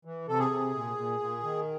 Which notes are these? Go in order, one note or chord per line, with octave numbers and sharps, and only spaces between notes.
E3
C3 A4
G#4
C3
A#2
A#2
A#2
D#3